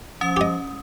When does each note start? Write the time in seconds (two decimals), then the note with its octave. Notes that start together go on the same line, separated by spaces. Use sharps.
0.21 F3 C#4 D#6
0.37 G4 D#5